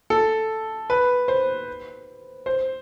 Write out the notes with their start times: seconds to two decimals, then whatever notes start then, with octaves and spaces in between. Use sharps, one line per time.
0.10 A4
0.90 B4
1.28 C5
2.46 C5